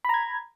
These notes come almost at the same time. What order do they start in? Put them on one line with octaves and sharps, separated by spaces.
B5 A#5 G#6